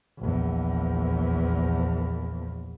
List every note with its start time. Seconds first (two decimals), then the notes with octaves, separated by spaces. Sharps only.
0.19 A#1 E2